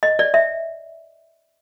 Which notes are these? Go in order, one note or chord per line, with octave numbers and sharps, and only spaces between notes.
D#5
D5
E5